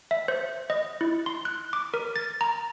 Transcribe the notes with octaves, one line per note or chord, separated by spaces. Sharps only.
E5
C5
D#5
E4
C6
F#6
D6
A#4
A6
A#5